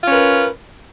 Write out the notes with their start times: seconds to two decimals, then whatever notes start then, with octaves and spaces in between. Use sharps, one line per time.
0.03 F4
0.06 C#4
0.10 B4
0.14 A#4